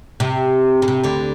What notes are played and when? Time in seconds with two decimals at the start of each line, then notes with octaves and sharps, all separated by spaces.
0.20 C3
0.82 C#3
0.88 C3
1.04 D2 D3